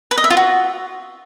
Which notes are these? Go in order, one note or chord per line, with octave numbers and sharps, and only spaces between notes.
B4
D#5
E5
F4
F#4